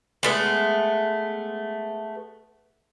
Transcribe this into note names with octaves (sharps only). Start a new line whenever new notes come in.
G#3 A3 B3